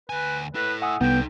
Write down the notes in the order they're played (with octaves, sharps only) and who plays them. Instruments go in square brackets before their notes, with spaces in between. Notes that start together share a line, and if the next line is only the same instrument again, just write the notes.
[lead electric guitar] D2 G#5 [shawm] B4
[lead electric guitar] E4 A4 [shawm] B4
[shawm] E5 [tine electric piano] F#5 G#5 D#6
[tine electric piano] C2 [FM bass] B3 [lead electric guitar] D#4 A4 [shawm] G5